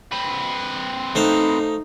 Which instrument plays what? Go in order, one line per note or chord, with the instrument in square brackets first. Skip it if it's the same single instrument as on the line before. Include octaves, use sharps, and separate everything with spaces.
[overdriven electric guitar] C4 B4
[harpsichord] A3 C5 F5 [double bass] D#4